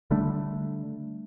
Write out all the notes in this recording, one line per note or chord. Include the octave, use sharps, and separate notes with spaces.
D3 G3 A3 D4